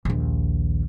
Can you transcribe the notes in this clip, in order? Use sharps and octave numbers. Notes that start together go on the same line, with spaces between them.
A#1 D#2